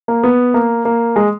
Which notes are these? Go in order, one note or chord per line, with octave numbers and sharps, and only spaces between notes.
A#3
B3
A#3
A#3
G#3